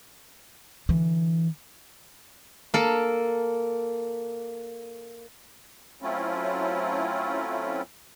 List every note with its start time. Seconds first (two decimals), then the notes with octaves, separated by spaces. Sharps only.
0.89 D3 E3
2.74 A#3 A4
6.02 F#3 A3 C4 C#4 E4 F4